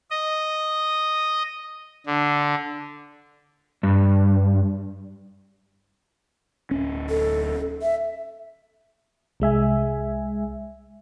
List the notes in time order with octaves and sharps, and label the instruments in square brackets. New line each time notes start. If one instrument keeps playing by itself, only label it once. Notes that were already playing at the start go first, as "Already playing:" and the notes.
[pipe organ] D#5
D3
[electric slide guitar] G2
[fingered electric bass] D1 C#4
[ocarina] A4
E5
[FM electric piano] C2 G#3 E5 G#5